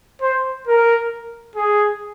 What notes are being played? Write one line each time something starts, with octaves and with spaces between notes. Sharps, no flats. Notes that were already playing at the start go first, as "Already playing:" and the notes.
C5
A#4
G#4